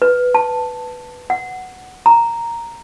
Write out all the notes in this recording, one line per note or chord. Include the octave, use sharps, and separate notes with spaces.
B4
A5
F#5
A#5